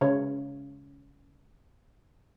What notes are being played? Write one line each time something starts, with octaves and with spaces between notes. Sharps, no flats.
C#3 C#5